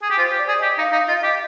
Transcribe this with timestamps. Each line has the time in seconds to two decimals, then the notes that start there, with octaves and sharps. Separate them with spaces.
0.02 G#4
0.10 G4
0.18 F4 C5
0.32 G4
0.38 D5
0.48 G#4
0.58 G4 D#5
0.78 D#4 F5
0.92 D#4
1.08 F4 D#5
1.15 F5
1.23 G4 D#5